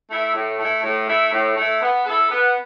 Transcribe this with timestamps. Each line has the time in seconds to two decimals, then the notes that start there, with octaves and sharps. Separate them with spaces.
0.11 A3 E4
0.35 A2
0.60 A3 E4
0.84 A2
1.08 A3 E4
1.33 A2
1.57 A3 E4
1.83 B3
2.06 E4 A4
2.31 B3